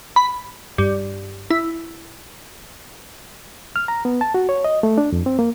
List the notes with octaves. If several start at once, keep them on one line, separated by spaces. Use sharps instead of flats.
B5
G2
E4
F6
A#5
B3
A5
F#4
C#5
D#5
A3
D4
F2
C4
A#3